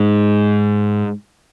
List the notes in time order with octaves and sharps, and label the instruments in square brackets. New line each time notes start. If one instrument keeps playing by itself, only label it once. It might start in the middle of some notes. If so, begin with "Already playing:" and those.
Already playing: [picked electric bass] G#2